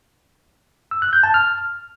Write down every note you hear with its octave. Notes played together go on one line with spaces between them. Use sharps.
E6
F#6
G6
A5
F6